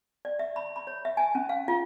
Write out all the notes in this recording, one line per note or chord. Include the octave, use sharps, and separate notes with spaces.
D5
E5
B5
B5
C#5
E5
G#5
C#4
F5
F4